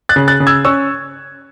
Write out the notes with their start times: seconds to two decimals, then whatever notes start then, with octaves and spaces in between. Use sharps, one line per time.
0.09 F#6 A6
0.16 C#3
0.28 F#6 A6
0.40 C#3
0.47 E6 G#6
0.65 C#4 C#6 E6